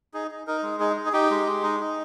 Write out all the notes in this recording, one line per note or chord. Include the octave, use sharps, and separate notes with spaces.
D#4 G#4
D#4
D#4 A#4
G#3
D#4 G#4
D#4
G#4
D#4 G4
G#3
G#3
D#4
D#4